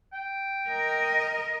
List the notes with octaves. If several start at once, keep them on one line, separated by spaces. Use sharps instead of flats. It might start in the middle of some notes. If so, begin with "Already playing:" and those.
G5
A#4 D#5